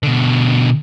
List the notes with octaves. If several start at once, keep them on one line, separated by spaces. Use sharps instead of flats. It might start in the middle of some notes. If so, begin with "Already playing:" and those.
B2 D3